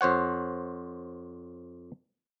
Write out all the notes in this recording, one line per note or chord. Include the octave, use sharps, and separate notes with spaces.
F2 C5 C#5 F#5